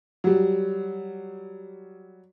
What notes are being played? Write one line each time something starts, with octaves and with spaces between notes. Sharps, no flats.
F#3 G3